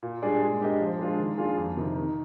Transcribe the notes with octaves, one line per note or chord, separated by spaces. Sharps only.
A#2
G3 D4 G#4 D5
G#3
D4 G4 A#4 D#5
F3
G#3 D4 F4 G#4
D#3
A#3 D4 F4 G#4
F2
C3 D#3
D#3